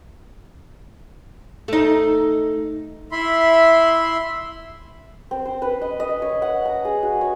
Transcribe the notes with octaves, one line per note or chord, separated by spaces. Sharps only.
A3 D#4
E4 E5 B5 C6
C4
C5
B4
D#5
D#5
C#5
F#5
A#5
G#4
F#4
C#5